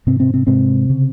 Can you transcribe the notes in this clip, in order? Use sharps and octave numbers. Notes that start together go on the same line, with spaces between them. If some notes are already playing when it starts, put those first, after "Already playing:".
G#2 C3 C4
C3 C4
C3 C4
G#2 C3 C4
C#3